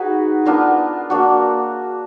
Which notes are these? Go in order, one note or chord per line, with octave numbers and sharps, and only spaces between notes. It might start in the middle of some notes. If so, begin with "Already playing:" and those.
Already playing: D#4 F#4 G#4 B4
B3 D4 F4 A#4
A#3 D4 F#4